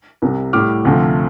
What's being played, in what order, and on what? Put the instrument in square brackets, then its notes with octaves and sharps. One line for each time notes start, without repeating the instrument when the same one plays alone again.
[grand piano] C2 C3 G3
A2 G3 D6 F6
D2 C3 F3 A3